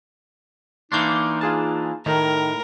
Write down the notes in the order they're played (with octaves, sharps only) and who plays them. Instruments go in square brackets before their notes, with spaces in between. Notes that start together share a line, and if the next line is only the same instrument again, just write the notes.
[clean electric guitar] E3 A#3 D4 [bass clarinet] D#4 [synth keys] C6 C#6 G6
[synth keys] F4 G#4 A5
[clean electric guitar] A2 [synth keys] D#3 [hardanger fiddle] A#4